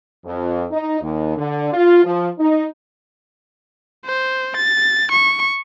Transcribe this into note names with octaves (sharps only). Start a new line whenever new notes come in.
F2
D#4
D#2
D3
F4
F3
D#4
C5
A6
C#6